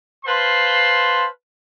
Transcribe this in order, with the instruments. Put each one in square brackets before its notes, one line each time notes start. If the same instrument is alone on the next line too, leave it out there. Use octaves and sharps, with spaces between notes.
[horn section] B4 C5 F5 A5 C6